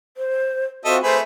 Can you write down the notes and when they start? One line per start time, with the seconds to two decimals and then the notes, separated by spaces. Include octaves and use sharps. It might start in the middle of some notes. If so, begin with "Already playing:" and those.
0.17 C5
0.85 C4 F4 F#4 A4 C5 D#5 E5
1.03 A3 G#4 B4 C5 E5